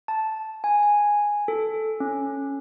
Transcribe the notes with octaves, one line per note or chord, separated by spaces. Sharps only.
A5
G#5
G#5
A4
C#4